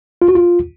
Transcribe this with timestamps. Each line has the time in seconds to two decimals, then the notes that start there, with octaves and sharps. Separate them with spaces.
0.22 F4
0.28 F#4
0.35 F4